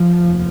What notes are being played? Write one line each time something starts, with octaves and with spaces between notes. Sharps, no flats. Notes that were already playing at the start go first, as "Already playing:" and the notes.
Already playing: F3
F1 D#2